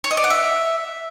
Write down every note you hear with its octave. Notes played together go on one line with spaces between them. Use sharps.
C#5
D#5
D5
F#5
E5